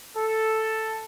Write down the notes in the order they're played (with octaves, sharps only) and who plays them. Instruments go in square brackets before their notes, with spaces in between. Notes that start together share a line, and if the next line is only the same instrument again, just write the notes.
[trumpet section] A4